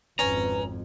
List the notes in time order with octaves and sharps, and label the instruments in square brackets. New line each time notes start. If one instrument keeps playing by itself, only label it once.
[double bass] G#1 F2 [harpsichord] C#4 [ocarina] B4 [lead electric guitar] A#5